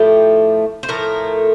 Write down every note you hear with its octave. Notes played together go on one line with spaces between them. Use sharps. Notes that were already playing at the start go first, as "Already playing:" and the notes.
Already playing: A2 F3 A3 G4
C5
A2 F3 A3 A#4